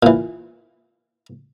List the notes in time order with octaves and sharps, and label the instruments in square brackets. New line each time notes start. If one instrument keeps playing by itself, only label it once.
[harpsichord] A#2 E3